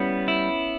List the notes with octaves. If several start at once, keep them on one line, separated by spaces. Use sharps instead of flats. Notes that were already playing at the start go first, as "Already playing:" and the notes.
Already playing: G3 B3 C#4 E4
E4